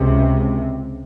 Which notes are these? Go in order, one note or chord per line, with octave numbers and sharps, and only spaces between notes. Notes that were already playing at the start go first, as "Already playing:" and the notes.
Already playing: C#2 C3